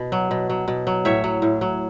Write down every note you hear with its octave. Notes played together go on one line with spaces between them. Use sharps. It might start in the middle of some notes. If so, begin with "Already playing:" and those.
Already playing: B2
F#3
B2
F#3
B2
F#3
A2 C#5 E5
F#3
A2
F#3